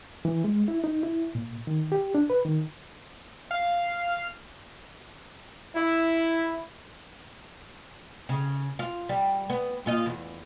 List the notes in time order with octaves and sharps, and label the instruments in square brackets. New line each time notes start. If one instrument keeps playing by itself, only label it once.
[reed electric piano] E3
G#3
E4
D#4
E4
A#2
D#3
G4
D4
B4
D#3
[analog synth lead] F5
[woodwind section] E4
[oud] C#3
F4
G3
B3
A#2 F4 D#5
E2